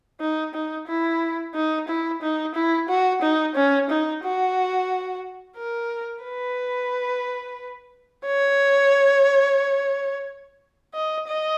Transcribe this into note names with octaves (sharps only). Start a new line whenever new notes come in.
D#4
D#4
E4
D#4
E4
D#4
E4
F#4
D#4
C#4
D#4
F#4
A#4
B4
C#5
D#5
D#5